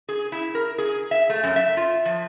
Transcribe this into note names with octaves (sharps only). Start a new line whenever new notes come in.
G#4
E4
A#4
G#4
E5
A3
F#2
E5
F4
F3